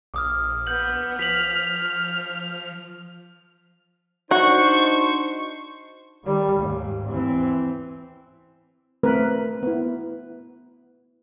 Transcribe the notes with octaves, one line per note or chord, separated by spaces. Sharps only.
A#1 D6 D#6 F6
B3 G6 F#7
F3 F6 B6 F7 F#7
D4 D#4 F#4 C5 C#6
D#3 G3
D#2 G#2
E3 C4
A3 C4 A#4 B4
B3 E4